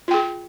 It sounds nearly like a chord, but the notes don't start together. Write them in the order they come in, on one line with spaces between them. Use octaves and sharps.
F4 G5 G#4